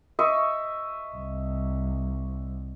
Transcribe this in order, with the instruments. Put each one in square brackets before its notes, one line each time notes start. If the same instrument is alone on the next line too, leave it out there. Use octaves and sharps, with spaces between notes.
[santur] D#5 E5 C#6
[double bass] C2